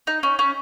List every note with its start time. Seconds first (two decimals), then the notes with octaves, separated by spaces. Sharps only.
0.07 D#4
0.23 C#4
0.39 C#4